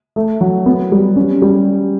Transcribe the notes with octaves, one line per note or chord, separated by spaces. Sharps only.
A3
F#3
B3
G3
C#4
G3